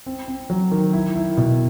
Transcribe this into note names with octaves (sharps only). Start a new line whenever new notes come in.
C4
C4
F#3
D#3
E4
E4
B2